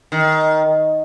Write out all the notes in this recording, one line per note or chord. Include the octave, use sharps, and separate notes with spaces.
D#3